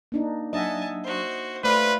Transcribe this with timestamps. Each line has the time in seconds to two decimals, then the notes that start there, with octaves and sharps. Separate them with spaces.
0.12 A#3 D4 D#4
0.53 F#3 D4 D#5 E5 F#5 G#5 A5
1.03 F#4 C5
1.64 A3 F4 B4 C5 D5 B5